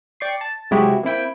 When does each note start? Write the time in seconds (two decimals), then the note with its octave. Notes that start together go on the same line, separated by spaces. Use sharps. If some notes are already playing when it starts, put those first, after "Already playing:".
0.20 D5 G5 C#6 C7
0.41 A5
0.71 C3 F#3 G#3 E4 F#4 G4
1.03 A#3 C4 E4 G5